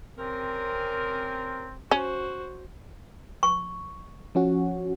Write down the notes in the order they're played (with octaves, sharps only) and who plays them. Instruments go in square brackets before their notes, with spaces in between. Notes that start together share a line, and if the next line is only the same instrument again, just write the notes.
[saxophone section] C3 C#4 A#4 [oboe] C4
[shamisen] C#4 [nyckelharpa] F#4 C5
[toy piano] C#6
[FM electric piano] F3 C#4 F#4